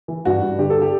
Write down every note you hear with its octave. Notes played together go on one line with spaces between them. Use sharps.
E3
G2 F#4
G2
D3 G4
A4
G4